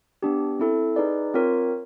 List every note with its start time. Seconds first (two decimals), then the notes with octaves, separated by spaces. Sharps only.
0.22 B3 D4 G4
0.59 C4 E4 A4
0.96 D#4 G#4 B4 D5
1.34 C4 F4 A#4 C#5